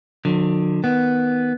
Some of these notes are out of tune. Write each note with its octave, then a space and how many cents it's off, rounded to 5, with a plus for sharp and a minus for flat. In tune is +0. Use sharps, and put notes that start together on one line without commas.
D3 +25 F#3 -40
D#3 +10 B3 +0